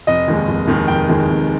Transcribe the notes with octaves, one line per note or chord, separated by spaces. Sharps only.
F1 D#5
D#2 D#3 G#3
F1
D#2 D#3 G#3
F1 G5
D#2 D#3 G#3
F1